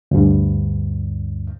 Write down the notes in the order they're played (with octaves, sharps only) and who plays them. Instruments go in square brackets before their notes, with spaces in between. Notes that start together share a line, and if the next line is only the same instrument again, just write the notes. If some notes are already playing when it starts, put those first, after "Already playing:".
[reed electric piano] D2 G2